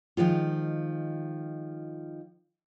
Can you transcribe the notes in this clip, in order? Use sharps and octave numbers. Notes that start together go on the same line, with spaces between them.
D#3 F3 G#3 F4